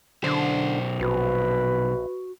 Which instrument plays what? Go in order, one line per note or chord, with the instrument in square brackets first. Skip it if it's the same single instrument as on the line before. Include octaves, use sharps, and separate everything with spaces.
[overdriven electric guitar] B1 C5 [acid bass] D3 [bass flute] D4
[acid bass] A#1 [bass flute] F#4 [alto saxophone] B4